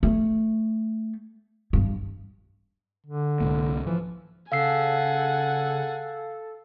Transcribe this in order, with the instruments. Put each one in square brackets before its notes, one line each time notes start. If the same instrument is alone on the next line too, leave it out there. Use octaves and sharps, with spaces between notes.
[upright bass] A3
G2
[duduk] D3
[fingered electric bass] C2 G#2 A#3
[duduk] E3 [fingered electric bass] F3
[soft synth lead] C#3 [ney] A4 [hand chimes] F5 E6 C7 [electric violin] F#5 G#5